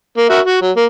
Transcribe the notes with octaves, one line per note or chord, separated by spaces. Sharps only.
A#3
F#4 A#4 E5
F#4
F#3
A#3